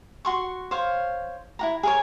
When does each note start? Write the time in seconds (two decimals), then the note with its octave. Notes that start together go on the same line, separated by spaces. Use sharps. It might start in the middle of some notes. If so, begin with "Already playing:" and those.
0.25 F#4 C6 C#6
0.71 C5 C#5 F5
1.59 E4 F#4 A#5
1.83 G#4 A#4 C#5